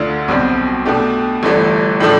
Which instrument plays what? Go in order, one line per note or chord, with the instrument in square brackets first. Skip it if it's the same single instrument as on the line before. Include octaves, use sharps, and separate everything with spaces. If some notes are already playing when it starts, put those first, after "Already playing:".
Already playing: [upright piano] D2 D3 A3 D4 F4
B1 B2 G3 C4
B2 A3 D4 G4
G1 G2 E3 A3
A2 F3 A3 D4